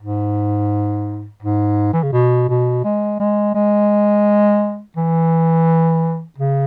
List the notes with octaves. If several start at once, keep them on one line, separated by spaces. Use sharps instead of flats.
G#2
G#2
E3
C#3
B2
B2
G#3
G#3
G#3
E3
C#3